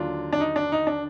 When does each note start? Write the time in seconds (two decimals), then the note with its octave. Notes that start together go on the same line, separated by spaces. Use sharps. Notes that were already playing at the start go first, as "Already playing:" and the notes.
Already playing: D#2 D3 F#3 D4 F4
0.33 D4
0.40 D#4
0.56 D4
0.72 D#4
0.87 D4